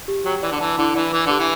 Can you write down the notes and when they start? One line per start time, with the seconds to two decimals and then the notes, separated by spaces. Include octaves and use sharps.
0.08 G4
0.25 F#3 G5
0.43 E3 D5
0.51 D3
0.60 E3 A5
0.78 D3 E4
0.95 E3 D5
1.12 E3 B4
1.26 D3 G4
1.39 E3